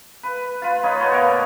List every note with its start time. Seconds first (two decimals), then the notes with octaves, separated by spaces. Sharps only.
0.23 B4
0.62 F4 B4
0.83 D#4 B4 C#5
1.00 B4 C#5 F#5 A5
1.12 B2 A#3 A#4